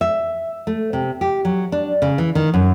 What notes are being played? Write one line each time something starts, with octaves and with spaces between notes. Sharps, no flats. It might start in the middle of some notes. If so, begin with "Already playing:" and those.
E5
A3
C3
G4
F#3
D4
C#3
E3
D#3
F#2